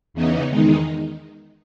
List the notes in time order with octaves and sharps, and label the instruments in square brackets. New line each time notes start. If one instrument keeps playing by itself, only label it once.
[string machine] E2 C#3 E3 B3 D#4
E2 D#3 G#3 D#4